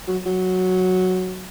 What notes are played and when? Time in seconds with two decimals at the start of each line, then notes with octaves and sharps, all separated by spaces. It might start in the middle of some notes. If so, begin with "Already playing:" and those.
0.08 F#3
0.26 F#3